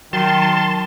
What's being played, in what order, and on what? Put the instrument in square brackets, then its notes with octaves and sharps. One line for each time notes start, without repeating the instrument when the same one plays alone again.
[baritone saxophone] D#3 [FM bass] F#3 [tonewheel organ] A5 C6